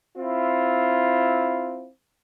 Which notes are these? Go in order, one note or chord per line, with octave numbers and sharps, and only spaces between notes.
C4 E4 F4